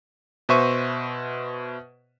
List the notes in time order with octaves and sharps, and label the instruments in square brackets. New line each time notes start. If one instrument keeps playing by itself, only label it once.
[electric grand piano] B2 B4 C5 E5 C#6 D#7